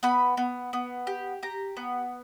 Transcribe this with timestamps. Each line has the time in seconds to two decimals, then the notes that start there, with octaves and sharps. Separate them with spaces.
0.03 B3 B5
0.37 B3
0.73 B3
1.07 G4
1.43 G4 A#5
1.77 B3